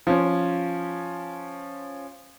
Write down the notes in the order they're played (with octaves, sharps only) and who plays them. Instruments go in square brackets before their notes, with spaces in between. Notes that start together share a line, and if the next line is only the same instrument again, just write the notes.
[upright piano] F3 C#4